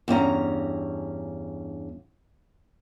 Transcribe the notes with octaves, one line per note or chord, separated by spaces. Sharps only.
E2 G2 C#4 A#5